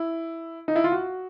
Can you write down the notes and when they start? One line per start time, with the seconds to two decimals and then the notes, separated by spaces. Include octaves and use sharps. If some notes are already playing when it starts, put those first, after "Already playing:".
Already playing: E4
0.68 D#4
0.76 E4
0.84 F4
0.92 F#4